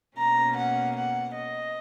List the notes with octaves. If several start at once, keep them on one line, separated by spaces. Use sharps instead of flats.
B2 A#3 C#4 A#5
F#5
F#5
D#5